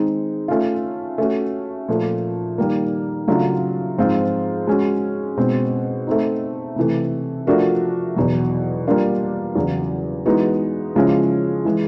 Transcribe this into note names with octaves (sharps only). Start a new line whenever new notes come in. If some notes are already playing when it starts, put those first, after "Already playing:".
Already playing: D#3 G#3 C4 D#4
A3 C#4 F4
A3 C#4 F#4
A#2 F3 A3
D#3 G3 A#3
C#3 F#3 A3 D4 F4
G#2 F3 G#3 C4 F4
G#3 C#4 F#4
B2 G#3 C4
A3 C4 D#4
C3 E3 A3
F3 A3 D4 F#4 A#4
E2 B2 F#3
G3 A#3 D4 F4 A#4
E2 C#3 F#3
E3 G#3 B3 D#4 F#4
C#3 F3 G#3 C#4 E4
E3 G#3